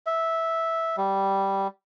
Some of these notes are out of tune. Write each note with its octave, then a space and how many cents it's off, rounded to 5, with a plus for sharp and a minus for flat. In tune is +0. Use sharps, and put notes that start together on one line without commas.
E5 -10
G3 -5